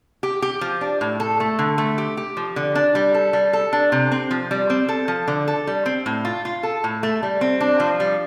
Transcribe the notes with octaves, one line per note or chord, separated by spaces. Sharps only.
G4
G4
F3
D4
A2
A4
A3
D3
A3
G4
G4
F3
D3
D4
G3
A4
G3
A4
D4
C3
C4
F3
G3
C4
A4
F3
D3
A4
G3
C4
A2
F4
F4
A4
A2
A3
G3
C4
D4
F3
G3